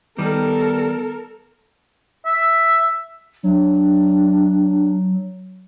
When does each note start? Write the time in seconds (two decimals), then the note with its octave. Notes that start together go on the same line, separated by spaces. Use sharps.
0.18 D#3 G3 B3 A4 A#4
2.25 E5
3.43 F#3 D4